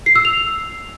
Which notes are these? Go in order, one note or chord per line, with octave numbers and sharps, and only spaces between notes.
C7
E6
F7